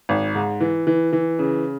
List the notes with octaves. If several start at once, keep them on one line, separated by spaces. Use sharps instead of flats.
G#1
G#2
E3
E3
E3
C#3